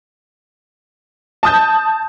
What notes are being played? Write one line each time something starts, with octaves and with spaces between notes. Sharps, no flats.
A5 D#6 G6